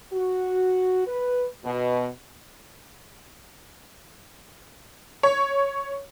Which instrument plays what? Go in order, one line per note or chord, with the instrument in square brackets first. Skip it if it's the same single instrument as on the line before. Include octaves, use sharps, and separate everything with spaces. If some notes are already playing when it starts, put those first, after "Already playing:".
[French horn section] F#4
B4
B2
[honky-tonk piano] C#5